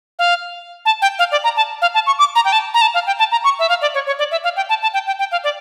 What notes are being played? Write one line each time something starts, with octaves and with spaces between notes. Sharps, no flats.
F5
A5
G5
F5
D5
A#5
A5
F5
A5
C#6
D6
A#5
G5
A5
A#5
A5
F5
G5
A5
A#5
C#6
E5
F5
D5
C#5
C#5
D5
E5
F5
G5
A5
A5
G5
G5
G5
F5
D5